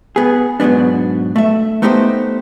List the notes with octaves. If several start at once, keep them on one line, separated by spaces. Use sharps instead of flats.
B3 G#4
G#2 B2 F#3 B3 D4
A3 E5
A3 B3 D#4 G4 B4 C5